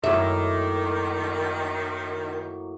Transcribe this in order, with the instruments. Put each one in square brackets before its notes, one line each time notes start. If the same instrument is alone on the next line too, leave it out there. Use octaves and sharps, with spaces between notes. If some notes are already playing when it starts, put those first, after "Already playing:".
[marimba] F#2 [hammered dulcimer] A2 F#3 A#3 [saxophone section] D#3 [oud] E5